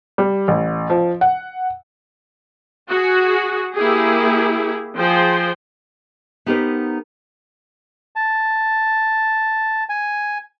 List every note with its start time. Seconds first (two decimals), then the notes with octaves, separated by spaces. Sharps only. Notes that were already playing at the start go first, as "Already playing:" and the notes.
0.18 G3
0.48 A1
0.90 F3
1.21 F#5
2.90 F#4 G#4
3.75 A#3 E4 G4 G#4
4.98 F3 G#4 C5 G5
6.46 B3 D#4 G4 A4 A#4 C5
8.16 A5
9.89 G#5